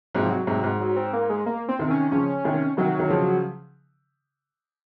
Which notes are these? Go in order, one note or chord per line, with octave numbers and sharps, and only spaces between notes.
G#2 C3 F#3
F3
F#3
G#2 C3
G#2
F#3
C4
A#3
G#3
A#3
C4
C3 D#3
C#4
C#3 F3 C#4
C3 D#3
C3 D#3 F#3
D#3
C#3 F3